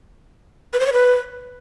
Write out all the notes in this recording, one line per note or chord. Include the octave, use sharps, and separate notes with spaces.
B4
C5
C#5
B4